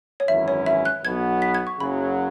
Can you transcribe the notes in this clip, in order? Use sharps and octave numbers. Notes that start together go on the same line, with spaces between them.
C#5
G#1 F#2 E3 C#4 E4 E5
C#5
E5
F#6
B1 B2 B3 G#6
B6
G#6
C#6
F#1 F#2 C#3 F#3 B5